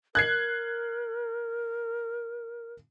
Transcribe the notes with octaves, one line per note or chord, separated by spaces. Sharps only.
A#4 F#6 G#6 C7